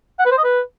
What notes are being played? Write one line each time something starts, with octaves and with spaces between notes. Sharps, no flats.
F#5
B4
C5
D#5
B4